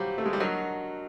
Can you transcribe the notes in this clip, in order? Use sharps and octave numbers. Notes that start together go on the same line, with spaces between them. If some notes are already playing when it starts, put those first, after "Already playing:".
Already playing: F#3 G3 G4 C5 F5
A3
G#3
G3
F#3 D4 F#4 A#4 D#5 F#5